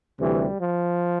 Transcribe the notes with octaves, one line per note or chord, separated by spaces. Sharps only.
D2 C3 E3 G3
F3